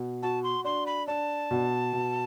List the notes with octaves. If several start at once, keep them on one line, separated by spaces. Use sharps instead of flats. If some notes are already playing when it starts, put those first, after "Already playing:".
Already playing: B2
F#4 A5
C6
D4 C6
B5
D4 A5
B2
B2